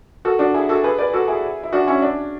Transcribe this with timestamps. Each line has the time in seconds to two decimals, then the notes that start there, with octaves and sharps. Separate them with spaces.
0.25 F#4 A4
0.39 D4 F#4
0.54 E4 G#4
0.69 F#4 A4
0.84 G#4 B4
0.98 B4 D5
1.13 F#4 A4
1.28 E4 G#4
1.63 E4
1.73 D4 F#4
1.87 C#4 E4
2.02 D4